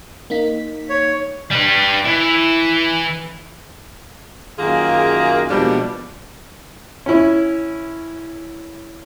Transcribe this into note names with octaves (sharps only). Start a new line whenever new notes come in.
A#3 D#4 B6
C#5
G3 B4
E3
F#2 D#3 A#3 F4 G#4
D#2 B2 F3 G3 G#3 D4
C#4 E4